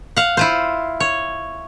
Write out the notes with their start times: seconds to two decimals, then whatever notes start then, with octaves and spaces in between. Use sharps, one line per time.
0.16 F5 F#5
0.37 E4 F4 C5
1.00 C#5